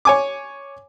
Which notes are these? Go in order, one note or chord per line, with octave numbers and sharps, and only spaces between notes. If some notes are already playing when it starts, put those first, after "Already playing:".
C#5 G#5 D6